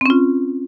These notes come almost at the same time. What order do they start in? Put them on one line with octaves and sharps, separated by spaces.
C4 C#4 F4